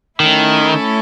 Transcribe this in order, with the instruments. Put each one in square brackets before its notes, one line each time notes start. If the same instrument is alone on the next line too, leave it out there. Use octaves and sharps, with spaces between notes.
[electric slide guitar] D#3 [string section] A3 C#4 E4 A4